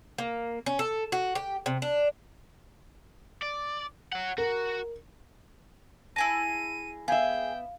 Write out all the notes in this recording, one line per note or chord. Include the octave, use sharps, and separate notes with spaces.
A#3
C#4
A4
F#4
G4
C3
D4
D5
C#5 F#5
F#4 A#4
E4 G#4 A5 A#6 D#7
B3 G#4 E5 F5 G5